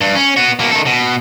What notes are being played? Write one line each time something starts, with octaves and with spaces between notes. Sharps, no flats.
G2
C#4
B3 F#4
B2 A#3
D#3 A4
B2